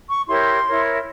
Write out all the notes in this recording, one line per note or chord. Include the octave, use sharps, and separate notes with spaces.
C#6
E4 G4 A#4 C#5 C6
E4 A#4 C#5